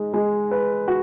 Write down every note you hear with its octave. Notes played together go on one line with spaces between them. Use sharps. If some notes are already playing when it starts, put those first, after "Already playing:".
Already playing: G#3 D#4
G#3
B4
F#4